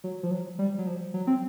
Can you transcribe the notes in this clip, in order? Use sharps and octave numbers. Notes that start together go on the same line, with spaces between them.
F#3
F3
F#3
G3
F#3
F3
F#3
C4